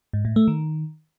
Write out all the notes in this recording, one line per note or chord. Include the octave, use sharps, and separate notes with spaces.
G#2
A2
A3
D#3